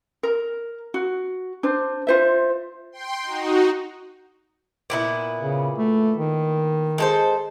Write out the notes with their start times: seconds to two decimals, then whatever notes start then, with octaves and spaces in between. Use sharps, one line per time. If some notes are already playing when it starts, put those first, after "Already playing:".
0.23 A#4
0.94 F#4
1.63 D4 C5
2.07 F4 C5 E5
2.92 G5 C6
3.23 D#4 F#4
4.90 A#2 B3 E4
5.40 C#3
5.78 A3
6.17 D#3
6.98 G#3 A4 C5